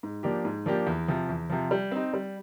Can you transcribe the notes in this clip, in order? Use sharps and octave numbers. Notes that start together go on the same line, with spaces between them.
G#2
F3 A#3 D4 G4
G#2
F3 A#3 D4 G4
E2
C3 F3
E2
C3 F3
G3
C4 D#4
G3